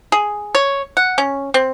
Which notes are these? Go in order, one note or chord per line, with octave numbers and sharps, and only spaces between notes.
G#4
C#5
F#5
C#4
C4